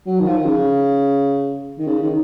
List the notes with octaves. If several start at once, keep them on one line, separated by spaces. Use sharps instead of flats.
F#3
D#3
F3
D#3
C#3
D#3
C#3
D#3